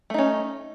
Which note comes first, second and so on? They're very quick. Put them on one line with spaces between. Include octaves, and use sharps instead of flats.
A3 D#4 C#4